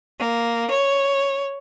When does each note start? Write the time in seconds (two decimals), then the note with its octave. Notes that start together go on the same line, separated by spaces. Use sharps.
0.20 A#3
0.70 C#5